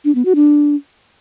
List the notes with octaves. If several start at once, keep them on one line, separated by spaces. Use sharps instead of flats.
D4
B3
F#4
D4